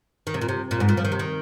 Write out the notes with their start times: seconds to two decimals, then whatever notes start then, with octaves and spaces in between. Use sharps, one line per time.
0.27 D#3
0.34 C3
0.41 A#2
0.48 C3
0.71 A#2
0.80 G#2
0.89 A#2
0.97 F3
1.05 D#3
1.12 C3
1.19 D#3